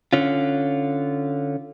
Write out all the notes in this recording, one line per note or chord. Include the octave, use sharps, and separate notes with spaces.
D3 C#4 F4